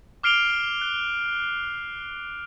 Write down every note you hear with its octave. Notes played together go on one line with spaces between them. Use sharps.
D6 F6 C7 D7 F7 G7
F#6